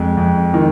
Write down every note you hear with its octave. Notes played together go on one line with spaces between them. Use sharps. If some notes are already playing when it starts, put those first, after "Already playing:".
Already playing: F2 G#3
F2
D#3